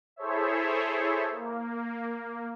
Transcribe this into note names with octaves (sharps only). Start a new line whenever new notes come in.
E4 G#4 A4 C5 C#5 E5
A#3